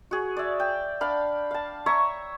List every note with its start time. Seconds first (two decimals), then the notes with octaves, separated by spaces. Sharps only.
0.11 F#4 G#4
0.37 D5 E5
0.60 G5
1.01 D4 F5 B5
1.51 F5 A5
1.86 C#5 E5 A#5 C#6